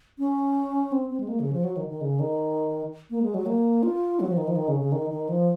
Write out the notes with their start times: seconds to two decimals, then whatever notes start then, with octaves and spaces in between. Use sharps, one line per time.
0.18 C#4
0.92 C4
1.10 C4
1.20 G#3
1.28 A#3
1.40 C#3
1.53 F3
1.64 F#3
1.77 D#3
1.89 D#3
2.01 C#3
2.20 D#3
3.10 A#3
3.23 G#3
3.34 F#3
3.46 A#3
3.83 F4
4.20 F#3
4.29 F3
4.37 D#3
4.47 F3
4.56 D#3
4.68 C#3
4.80 C#3
4.92 D#3
5.10 D#3
5.29 F3